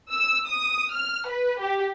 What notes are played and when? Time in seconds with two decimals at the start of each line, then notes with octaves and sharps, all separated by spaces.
0.11 E6
0.47 D#6
0.94 F6
1.28 B4
1.60 G4